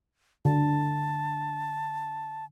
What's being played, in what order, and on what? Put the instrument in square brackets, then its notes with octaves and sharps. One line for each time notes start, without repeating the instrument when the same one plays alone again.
[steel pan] D3 [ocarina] A5